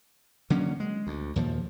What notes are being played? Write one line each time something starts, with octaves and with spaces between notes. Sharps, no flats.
D3 F#3 A#3 C#4
G#3
D2
D#2 A#2 F3